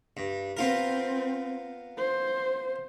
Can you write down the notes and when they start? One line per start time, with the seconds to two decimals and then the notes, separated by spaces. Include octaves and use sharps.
0.17 G2
0.57 B3 C4 F4 A#4
1.98 C5